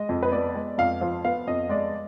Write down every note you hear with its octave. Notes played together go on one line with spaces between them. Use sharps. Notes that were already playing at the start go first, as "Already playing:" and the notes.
Already playing: G#3 D#5
F2
B4
B3 D5
G#3
F2 F5
F3 F5
B3 F5
F2 D#5
G#3 D5